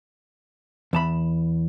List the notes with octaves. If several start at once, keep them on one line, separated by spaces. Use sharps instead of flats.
E2 A5 B5